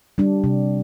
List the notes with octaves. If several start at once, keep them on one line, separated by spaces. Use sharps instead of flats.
G3 D4
C3